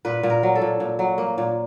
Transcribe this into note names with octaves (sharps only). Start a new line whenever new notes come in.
A#2 B4
A#2
A#4
F#3
A4
A#2
A#2
F#3
A#3
A#2